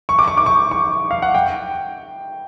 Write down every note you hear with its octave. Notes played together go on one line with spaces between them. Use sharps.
C#6
D6
C#6
D6
C#6
C#6
F5
F#5
G5